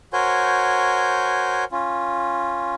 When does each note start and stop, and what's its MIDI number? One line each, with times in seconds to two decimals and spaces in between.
0.13 1.64 66
0.13 1.64 70
0.13 1.64 72
0.13 1.64 73
0.13 1.64 80
0.13 1.64 91
1.72 2.75 61
1.72 2.75 65